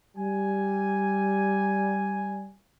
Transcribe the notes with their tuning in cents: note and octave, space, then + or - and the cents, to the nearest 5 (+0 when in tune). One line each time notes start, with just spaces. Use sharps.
G3 -5 G#5 +0